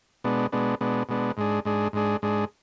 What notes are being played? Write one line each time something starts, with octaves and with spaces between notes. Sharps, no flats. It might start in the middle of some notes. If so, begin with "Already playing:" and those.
B2 G#3 B3 D4
B2 G#3 B3 D4
B2 G#3 B3 D4
B2 G#3 B3 D4
G#2 G#3 D4 G#4
G#2 G#3 D4 G#4
G#2 G#3 D4 G#4
G#2 G#3 D4 G#4